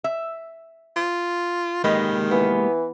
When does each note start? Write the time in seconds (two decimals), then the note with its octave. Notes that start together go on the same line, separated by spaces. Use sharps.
0.04 E5
0.96 F4
1.84 D#3 G#3 A#3 G4 B4 D#5
2.31 E3 B3